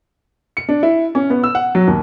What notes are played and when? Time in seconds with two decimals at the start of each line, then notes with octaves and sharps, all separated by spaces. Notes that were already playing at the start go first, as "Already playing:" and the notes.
0.57 C#7
0.69 D4
0.83 E4
1.15 C#4
1.30 B3
1.44 E6
1.55 F#5
1.75 F#3
1.88 D#2